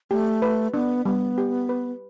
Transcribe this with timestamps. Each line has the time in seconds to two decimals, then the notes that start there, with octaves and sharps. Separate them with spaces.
0.11 A3 G4
0.42 B4
0.74 B3 D4
1.05 G3 B3
1.38 G4
1.69 B4